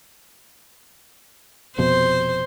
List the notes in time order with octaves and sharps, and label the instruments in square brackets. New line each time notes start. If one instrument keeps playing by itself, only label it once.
[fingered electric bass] F1 F2 B2 [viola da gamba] C5